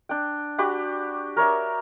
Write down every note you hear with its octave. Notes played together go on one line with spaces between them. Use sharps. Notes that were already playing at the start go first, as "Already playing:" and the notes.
D4 G5
F#4 G4 B5 D6
A#4 C#5 D5 E5